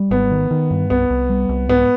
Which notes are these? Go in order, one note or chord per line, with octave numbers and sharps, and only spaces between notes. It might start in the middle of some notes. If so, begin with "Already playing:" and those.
Already playing: G3
G#1 B3
D#3
D#3
G2
C2 B3
C2
G3
C2
G#2 B3